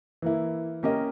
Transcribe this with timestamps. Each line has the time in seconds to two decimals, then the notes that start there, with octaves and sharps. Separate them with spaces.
0.22 E3 A#3 E4
0.83 A#3 C#4 G4 A#4 D#5